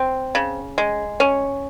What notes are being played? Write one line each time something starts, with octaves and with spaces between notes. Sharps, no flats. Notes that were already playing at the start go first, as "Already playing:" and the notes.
Already playing: C4
C#3
G#3
C#4